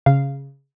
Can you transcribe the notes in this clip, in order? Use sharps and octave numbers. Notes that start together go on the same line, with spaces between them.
C#3 F5